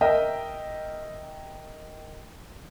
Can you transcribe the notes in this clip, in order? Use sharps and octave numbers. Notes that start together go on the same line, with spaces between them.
A#4 D#5 E5 G5